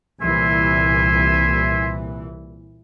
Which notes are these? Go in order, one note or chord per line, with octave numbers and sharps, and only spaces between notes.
C2 A#2 E3 E5 G#5 C6